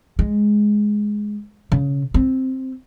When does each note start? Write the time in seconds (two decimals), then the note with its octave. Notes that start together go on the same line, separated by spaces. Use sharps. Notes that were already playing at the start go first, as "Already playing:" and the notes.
0.19 G#3
1.72 C#3
2.14 C4